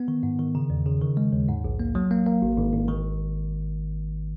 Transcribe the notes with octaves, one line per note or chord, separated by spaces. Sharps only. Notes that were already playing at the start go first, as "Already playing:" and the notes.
Already playing: B3
D#3
G#2
D#3
C#3
E2
C#3
D#3
G#3
D#2
G#2
A#1
A#3
F#3
A#3
A#3
G#1
G#1
G#1
D#3